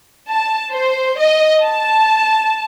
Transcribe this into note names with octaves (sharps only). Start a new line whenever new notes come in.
A5
C5
D#5
A5